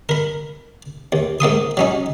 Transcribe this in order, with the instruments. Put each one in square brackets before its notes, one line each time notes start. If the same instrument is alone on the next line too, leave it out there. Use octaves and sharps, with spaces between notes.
[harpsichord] A#4 B5
D#2
G#2 A#3 C6 D#6
F#3 C#4 D#4